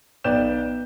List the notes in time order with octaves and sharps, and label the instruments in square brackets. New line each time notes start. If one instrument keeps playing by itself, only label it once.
[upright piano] B1 B3 D5 G5 G6 E7